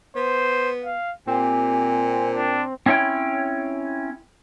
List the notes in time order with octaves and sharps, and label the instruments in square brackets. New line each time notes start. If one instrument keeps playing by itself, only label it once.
[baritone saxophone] B3 [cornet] C5
[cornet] F5
[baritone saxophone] A#2 [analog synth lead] C4 [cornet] G4 [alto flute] G#5
[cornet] D4
[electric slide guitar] C4 C#4 E4 C#5 G5